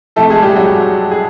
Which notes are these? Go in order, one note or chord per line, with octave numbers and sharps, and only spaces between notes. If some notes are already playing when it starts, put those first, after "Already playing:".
C3 F3 A3 A4
G#3 G#4
G3 G4
F#3 F#4
G#4